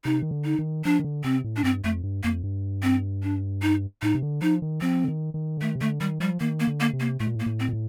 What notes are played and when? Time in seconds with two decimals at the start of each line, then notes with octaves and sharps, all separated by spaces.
0.05 C3 D#4
0.22 D#3
0.31 D3
0.45 D#4
0.59 D#3
0.85 F3 D4
1.00 D#3
1.04 D3
1.24 C3 C4
1.44 A2
1.56 D4
1.64 G2 C4
1.84 F2 A3
2.03 G2
2.23 F2 A#3
2.43 G2
2.83 C4
3.23 D4
3.62 D#4
4.02 A2 D#4
4.15 C3
4.22 D3
4.41 F3 D#4
4.62 D#3
4.81 F3 C4
5.04 D3
5.08 D#3
5.34 D#3
5.57 D3
5.61 D#3 A3
5.76 C3
5.81 D3 A3
6.01 D#3 G3
6.20 F3 G3
6.40 D#3 A#3
6.60 A#3
6.67 D3
6.80 A#3
6.93 C3
7.00 A#3
7.20 A2 A3
7.27 A#2
7.35 A2
7.40 A#3
7.46 A2
7.60 C4
7.69 A#2
7.73 A2